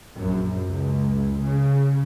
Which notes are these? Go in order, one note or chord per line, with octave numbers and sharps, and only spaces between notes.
A#1 F#2
C#2
C#3